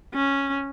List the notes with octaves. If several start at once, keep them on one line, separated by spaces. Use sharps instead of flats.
C#4